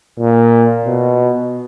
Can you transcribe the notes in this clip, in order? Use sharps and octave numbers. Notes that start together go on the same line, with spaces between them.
A#2
B2